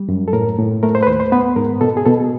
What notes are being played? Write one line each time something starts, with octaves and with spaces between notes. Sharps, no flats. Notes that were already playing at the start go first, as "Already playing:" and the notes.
Already playing: G3
F#2
A4
A2 A#4
A2
A3 A#4
C5
B4
D#2 C5
C5
B3 B4
G#2 A#4
B2 A4
G#4
B2 A4